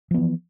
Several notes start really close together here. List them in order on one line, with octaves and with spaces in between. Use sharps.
F3 B3 E3